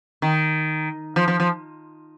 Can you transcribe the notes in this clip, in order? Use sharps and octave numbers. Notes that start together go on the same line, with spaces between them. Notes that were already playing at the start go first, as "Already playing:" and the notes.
D#3
F3
F3
F3